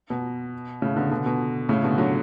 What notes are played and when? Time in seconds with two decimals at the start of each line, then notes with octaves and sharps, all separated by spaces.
0.10 B2
0.82 A2 C#3
0.96 B2 D3
1.11 B2 D3
1.26 B2
1.69 A2 C#3
1.83 B2 D3
1.98 D3 F#3